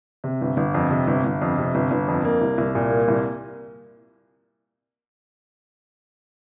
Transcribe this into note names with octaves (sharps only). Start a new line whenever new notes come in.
C3
G1
G1
F2
C3
G1
G1
F2
C3
G1
G1
F2
A#3
C2
C2
A#2
A#3
C2